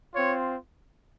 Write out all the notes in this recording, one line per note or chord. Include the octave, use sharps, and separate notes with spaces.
C4 F4 C#5